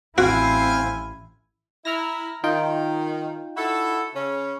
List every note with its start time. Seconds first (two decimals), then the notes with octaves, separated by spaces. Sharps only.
0.18 A1 C4 E4 F#4 C5 F5 G#5
1.85 E4 A#5 F6 A#6
2.44 D#3 D#4 F4 G5
3.56 E4 F#4 A4
4.14 C#3 C#4